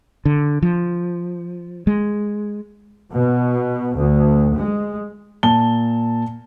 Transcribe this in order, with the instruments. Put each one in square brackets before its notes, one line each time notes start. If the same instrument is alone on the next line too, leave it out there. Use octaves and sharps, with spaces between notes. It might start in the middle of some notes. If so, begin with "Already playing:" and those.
[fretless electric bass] D3
F3
G#3
[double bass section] B2
D2
G#3
[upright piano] A#2 A5 G7